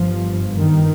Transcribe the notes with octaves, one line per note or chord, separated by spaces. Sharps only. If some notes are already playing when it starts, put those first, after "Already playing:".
Already playing: G1 G2 F3
D#3